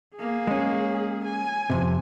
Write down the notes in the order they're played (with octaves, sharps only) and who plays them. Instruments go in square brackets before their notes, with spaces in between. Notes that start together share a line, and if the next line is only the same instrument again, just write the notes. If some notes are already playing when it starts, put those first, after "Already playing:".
[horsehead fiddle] A#3 G#4
[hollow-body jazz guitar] G#3 C#4
[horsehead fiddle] G#5
[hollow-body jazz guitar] F2 A2 C3